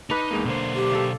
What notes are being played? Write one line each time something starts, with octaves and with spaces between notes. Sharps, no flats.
D4 D#4 B4
E2 G#3 A#3
B1 D3 A#3 C5
G4
A4 D5 F5